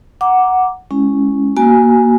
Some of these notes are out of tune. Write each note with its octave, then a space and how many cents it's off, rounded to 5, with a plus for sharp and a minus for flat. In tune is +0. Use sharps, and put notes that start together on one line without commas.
F#5 +0 A#5 +15 D6 +0
G#3 +0 C#4 +0 E4 +0
A#3 +15 F#4 +20 G#5 +0